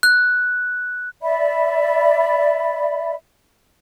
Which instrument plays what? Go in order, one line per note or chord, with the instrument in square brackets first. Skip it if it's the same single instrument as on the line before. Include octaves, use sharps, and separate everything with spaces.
[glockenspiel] F#6
[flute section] D5 E5 B5